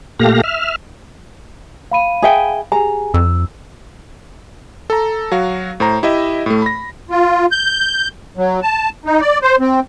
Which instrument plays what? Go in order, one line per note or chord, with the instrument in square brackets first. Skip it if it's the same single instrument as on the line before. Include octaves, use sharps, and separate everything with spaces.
[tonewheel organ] A#2 A3 G4 F5 A#6
E5 F6
[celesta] F5 B5 D#7
[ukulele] G#4 E5 G5
[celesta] G4 G#4 G#5 [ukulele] A#5
[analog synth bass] F2 [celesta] E6
[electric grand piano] A4 A#5
F#3 F#4 F5
A2 C5 A#5
E4 G4 D#5 E5
A2 A3
B5 A#6
[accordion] F4
G6
F#3
A5
D#4
D5
C5
C4